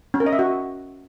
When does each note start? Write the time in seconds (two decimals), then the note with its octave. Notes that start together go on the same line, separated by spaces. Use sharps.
0.14 C#4
0.20 A#4
0.26 D#5
0.33 E5
0.39 F#4